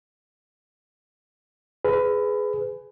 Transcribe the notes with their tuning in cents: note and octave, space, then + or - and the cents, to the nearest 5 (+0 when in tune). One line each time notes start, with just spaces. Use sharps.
G#4 +10 B4 +20